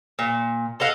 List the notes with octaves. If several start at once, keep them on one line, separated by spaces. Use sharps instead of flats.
A#2
A4 D#5 F5 F#5